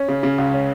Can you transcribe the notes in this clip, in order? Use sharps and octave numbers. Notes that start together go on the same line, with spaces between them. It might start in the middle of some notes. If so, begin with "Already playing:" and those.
Already playing: C#4
C#3
C#3
C#2
C#4